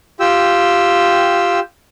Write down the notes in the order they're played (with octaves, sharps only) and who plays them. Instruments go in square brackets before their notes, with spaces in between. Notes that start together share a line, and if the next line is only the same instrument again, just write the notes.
[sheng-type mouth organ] F4 G4 G5 E6